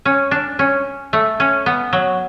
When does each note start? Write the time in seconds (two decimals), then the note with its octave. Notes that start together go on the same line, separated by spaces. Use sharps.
0.05 C#4
0.31 D4
0.59 C#4
1.13 A3
1.40 C#4
1.66 B3
1.93 F#3